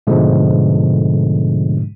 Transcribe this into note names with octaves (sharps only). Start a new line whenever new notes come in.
G#2 B2 D3 F3 G#3 A3